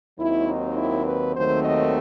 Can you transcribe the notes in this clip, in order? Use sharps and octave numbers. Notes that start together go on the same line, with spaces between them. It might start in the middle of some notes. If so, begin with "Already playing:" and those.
D#2 D#3 F#3 C4 E4
D#4
E4
B4
D#2 D#3 F#3 A3 C4 C5
D#5